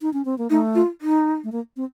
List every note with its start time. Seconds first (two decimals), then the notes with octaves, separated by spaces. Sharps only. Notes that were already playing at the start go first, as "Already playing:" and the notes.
0.00 D#4
0.13 C#4
0.25 C4
0.38 A#3
0.50 A3 D#4
0.75 F4
1.01 D#4
1.44 A3
1.52 A#3
1.77 C4